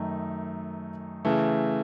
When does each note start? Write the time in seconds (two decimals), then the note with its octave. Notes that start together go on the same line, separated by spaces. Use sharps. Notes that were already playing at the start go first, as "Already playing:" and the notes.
Already playing: F#2 D#3 A3 D#4
1.25 C#3 E3 A3